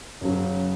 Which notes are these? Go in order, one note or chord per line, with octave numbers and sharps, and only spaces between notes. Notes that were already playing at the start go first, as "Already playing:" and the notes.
F#2 C#3 F#3